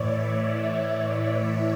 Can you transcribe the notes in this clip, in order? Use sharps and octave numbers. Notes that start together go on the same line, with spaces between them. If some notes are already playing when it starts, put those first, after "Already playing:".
Already playing: A2 E3 C#5 D5 E5
D5
C#5